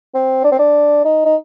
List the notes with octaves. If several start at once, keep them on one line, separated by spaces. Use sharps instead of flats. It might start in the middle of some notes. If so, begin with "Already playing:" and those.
C4
D4
C4
D4
D#4
D#4